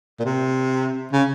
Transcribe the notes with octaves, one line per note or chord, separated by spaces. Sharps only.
A#2
C3
C#3